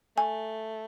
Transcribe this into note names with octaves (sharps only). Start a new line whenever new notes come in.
A3 G#5